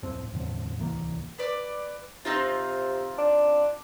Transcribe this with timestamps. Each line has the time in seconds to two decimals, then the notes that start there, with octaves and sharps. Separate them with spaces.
0.03 D1 F2 A2 C4
0.33 E2 A2 D3 C4
0.77 D1 C2 E3 A#3
1.39 B4 D5
2.25 C3 C4 D#4 F4
3.18 D4